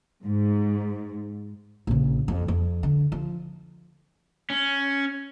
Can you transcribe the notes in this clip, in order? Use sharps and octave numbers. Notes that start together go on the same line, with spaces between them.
G#2
A#1 C#3
F2
F2
D3
F3
C#4